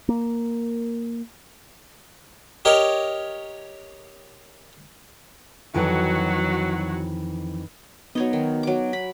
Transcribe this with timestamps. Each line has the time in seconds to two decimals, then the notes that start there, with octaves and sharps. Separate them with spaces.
0.09 A#3
2.65 G4 A#4 C#5 D#5
5.74 F2 D#3 E3 F#3 F#4
8.15 F#3 B3 D#4 C#5 D#5
8.33 D#3
8.63 F#3 D6
8.93 B5